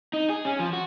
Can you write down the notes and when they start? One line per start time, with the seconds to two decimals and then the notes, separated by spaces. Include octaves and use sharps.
0.13 D#4
0.30 G#4
0.45 C#4
0.60 F3
0.73 F#4